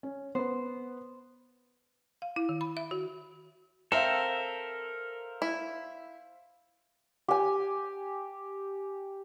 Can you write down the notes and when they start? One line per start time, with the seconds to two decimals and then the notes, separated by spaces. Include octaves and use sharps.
0.03 C#4
0.35 B3 B4 C5
2.22 F5
2.36 E4
2.49 D#3
2.61 B5
2.77 E5
2.91 F#4
3.92 C4 A4 A#4 C5 E5 F5
5.42 E4
7.28 G4 G#5